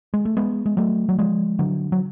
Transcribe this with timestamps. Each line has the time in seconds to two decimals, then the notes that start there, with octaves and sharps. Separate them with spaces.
0.14 G#3
0.25 A3
0.37 G#3 B3
0.66 G#3
0.77 F#3 A3
1.09 F#3
1.19 F3 G#3
1.59 D3 F#3
1.92 F#3